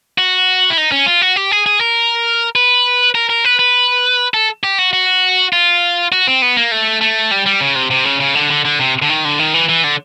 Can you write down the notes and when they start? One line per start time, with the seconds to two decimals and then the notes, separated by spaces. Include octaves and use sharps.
0.18 F#4
0.70 E4
0.77 D#4
0.92 C#4
1.06 F4
1.22 F#4
1.36 G4
1.52 G#4
1.66 G#4
1.81 A#4
2.56 B4
3.15 A#4
3.30 A#4
3.45 B4
3.59 B4
4.34 A4
4.63 G4
4.78 F#4
4.93 F#4
5.53 F4
6.12 F#4
6.27 C4
6.42 B3
6.56 A#3
6.72 A3
7.01 A3
7.31 G3
7.46 G3
7.61 C#3
7.75 C3
7.91 C3
8.05 C#3
8.20 C#3
8.35 D3
8.50 D3
8.65 D3
8.79 C3
9.02 D3
9.10 D#3
9.25 D3
9.39 D#3
9.54 E3
9.69 E3
9.84 D3